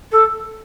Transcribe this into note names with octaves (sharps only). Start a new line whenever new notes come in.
A4